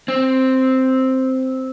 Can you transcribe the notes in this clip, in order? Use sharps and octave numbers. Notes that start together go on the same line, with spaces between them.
C4